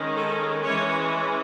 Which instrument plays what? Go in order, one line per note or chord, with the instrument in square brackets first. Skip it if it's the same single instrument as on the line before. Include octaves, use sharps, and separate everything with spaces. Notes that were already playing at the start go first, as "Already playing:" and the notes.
Already playing: [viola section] D#3 G#3 C#4
A4
E3 G#3 C#4 C#5